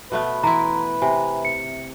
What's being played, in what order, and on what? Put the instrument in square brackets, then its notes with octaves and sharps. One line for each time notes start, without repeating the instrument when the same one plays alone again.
[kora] B2 A3 B3 [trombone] B4
[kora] E3 E4 [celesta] A#5 C6
[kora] C3 [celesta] G#5
[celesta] C#7